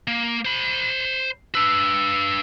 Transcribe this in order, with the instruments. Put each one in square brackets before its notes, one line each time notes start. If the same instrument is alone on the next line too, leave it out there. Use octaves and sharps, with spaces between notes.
[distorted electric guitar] A#3
C5 B5
[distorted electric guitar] D4 B4 [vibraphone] E6